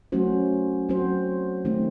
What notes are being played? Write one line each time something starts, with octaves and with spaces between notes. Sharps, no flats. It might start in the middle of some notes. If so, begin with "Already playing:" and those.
F#3 A3 C#4 F#4 C5
F#3 C4 F#4 C5
D#3 A3 C4